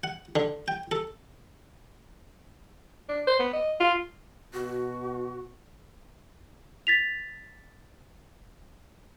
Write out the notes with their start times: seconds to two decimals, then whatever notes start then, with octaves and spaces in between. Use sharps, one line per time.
0.04 F#5
0.36 D3
0.68 G5
0.91 A4
3.09 D4
3.27 C5
3.39 B3
3.53 D#5
3.81 F4
4.53 B2 F#4
6.87 A6 B6 F7